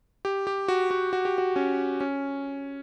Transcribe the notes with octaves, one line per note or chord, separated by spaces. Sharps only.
G4
G4
F#4
F#4
F#4
G4
F#4
C#4
C#4